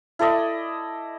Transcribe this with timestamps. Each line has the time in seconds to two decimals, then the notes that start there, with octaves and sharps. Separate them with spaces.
0.19 E4 A4 D5 D#5